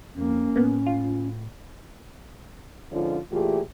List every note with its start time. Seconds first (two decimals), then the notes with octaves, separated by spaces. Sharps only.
0.15 F2 A#3 C#4
0.56 A2 A#3 B3
0.86 F4
2.92 G#2 D3 F3 C#4 F4
3.32 A#2 E3 A3 F4 G4 G#4